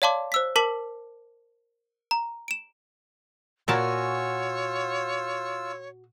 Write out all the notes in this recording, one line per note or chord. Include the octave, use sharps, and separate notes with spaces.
C#5 D5 F5 A5 C6 D6
C5 E6 B6
A#4 A5 D6 B6 F#7
A#5
D7 E7
A#2 F4 F#4 A#4 C#5 G#5 A5 E6